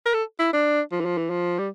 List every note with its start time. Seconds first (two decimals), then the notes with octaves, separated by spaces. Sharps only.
0.05 A#4
0.14 A4
0.39 E4
0.53 D4
0.91 F3
1.00 E3
1.05 F3
1.17 E3
1.30 F3
1.58 G3